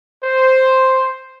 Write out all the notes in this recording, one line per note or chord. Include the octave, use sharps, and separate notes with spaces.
C5